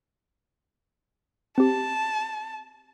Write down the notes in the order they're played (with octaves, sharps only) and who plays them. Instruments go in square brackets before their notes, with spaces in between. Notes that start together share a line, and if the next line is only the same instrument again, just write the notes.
[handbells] C4 G4 [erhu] A5